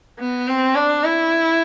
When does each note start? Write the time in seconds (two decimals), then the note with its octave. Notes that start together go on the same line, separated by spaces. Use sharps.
0.20 B3
0.48 C4
0.75 D4
1.04 E4